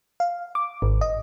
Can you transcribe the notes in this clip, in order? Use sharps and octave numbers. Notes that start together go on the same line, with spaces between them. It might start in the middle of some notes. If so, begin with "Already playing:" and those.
F5
D6
G#1
D#5